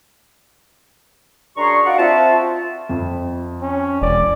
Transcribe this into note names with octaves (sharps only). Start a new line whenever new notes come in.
F#2 D4 G#4 A#5 C6 C#6
D#4 F#4 D5 F5 F#5
C4 F4 E5 A5
F2
C#4
E1 D5